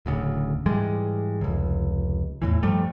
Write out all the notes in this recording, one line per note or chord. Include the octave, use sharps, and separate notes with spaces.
D1 D2 C#3
G#2 E3 G3 G#3
F1 C#2
E2 A2 E3
G2 F3 G3 A3